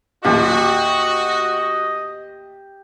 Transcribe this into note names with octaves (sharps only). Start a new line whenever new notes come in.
A1 D#2 A#2 F#4 G4 D#5